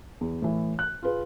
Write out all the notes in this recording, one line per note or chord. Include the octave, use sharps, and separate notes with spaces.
E2
A2 E3
F#6
F4 G#4 B4